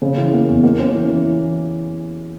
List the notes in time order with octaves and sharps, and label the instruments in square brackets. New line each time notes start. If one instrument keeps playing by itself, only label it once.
[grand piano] C#3
E3
A#3
E2
A#3
C#4
E3
E3